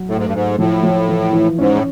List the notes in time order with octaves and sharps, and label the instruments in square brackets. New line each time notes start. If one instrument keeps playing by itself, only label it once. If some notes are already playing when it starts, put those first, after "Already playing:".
Already playing: [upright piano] F#3
[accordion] A2 [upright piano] A3
[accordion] G#2
G2
[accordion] G#2 [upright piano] A3
[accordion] A2 [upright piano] F3
[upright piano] F3
E3
E3
[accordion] G#2 [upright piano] C#4
[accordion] A2